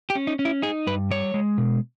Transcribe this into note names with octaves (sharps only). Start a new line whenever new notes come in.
G4
C#4
D#4
C#4
E4
D#4 G#4
G2 B4
G3 C#5
G#3
B2